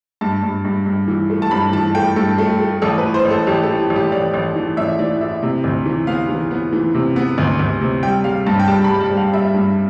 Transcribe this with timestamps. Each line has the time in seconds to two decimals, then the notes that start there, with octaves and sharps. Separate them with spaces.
0.21 G2 A5
0.43 G2
0.65 G2
0.86 G2
1.08 E3
1.30 A3
1.42 A5
1.51 G2 B5
1.73 E3 A5
1.95 A3 G5
2.16 G2 A4
2.38 A3
2.60 A3
2.82 A1 A4
2.98 B4
3.03 A2
3.14 C5
3.25 A1
3.31 A4
3.47 A1 G4
3.63 A4
3.68 A2
3.80 G4
3.90 A1
3.96 G4
4.12 A1 D5
4.34 A1
4.56 E3
4.77 A1 E5
4.99 E3 D5
5.21 A2 E5
5.43 C3
5.64 D2
5.86 E3
6.07 B3 F5
6.29 E3
6.51 B3
6.73 E3
6.95 C3
7.16 B3
7.38 D2
7.59 D2
7.81 C3
8.03 G3 G5
8.24 G3 F5
8.46 G2 A5
8.59 G5
8.67 G3 A5
8.84 B5
8.90 G3
9.01 A5
9.11 G3
9.17 F5
9.33 G3 E5
9.55 G2